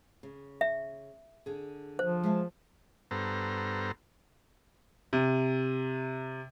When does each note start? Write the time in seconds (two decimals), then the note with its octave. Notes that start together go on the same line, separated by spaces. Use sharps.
0.23 C#3
0.61 E5
1.46 D3 G#4
1.99 F3 C5
2.23 G#3 E5 A5
3.11 G2 B3 A4 C5 A#5
5.13 C3